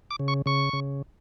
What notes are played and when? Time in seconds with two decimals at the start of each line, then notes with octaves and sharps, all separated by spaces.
0.11 D6
0.20 C#3
0.28 C#6
0.46 C#3 C#6
0.73 C#3